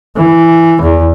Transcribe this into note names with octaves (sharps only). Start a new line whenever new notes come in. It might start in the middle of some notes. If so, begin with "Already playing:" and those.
E3
E2